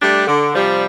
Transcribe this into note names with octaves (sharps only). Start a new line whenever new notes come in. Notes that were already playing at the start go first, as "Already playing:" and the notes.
G3 A3 D4 G4
D3
C3 F3 G3